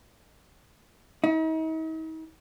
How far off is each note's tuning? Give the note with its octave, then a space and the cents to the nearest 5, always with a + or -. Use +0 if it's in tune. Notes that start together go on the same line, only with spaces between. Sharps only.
D#4 +45